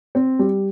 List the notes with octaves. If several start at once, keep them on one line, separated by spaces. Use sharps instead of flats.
C4
G3